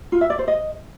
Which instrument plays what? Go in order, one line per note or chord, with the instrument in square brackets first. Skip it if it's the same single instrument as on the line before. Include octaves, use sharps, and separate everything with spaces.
[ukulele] F4
E5
D5
C5
D#5